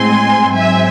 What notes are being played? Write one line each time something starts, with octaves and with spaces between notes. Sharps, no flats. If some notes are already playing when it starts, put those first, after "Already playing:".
Already playing: A2 G#3 C4 G#5 C6
G#2 F#3 C4 E5 G#5